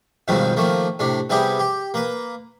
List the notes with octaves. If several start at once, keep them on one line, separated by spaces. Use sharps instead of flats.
C#2 G2 B2 D#3 F3 C4
D#3 F3 A3 A#3
A2 C3 D4
C3 G3 B3 E4 G4 G#4
G4
A#3 B4